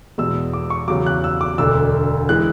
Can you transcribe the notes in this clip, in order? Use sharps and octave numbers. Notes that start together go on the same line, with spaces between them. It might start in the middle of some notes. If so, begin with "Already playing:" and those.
E2 B2 G#3 E6
D6
C#6
E2 C#3 F#3 D6
F#6
E6
D6
E1 D2 D3 E6
E3 G#3 F#6